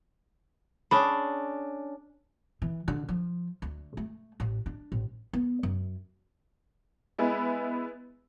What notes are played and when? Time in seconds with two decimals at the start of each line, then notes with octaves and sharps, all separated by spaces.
0.91 C#4 D4 G#4 B5
2.62 E3
2.88 D3
3.09 F3
3.62 D2
3.97 A3
4.40 A1
4.66 D4
4.92 A1
5.33 B3
5.63 F#2
7.18 G#3 B3 E4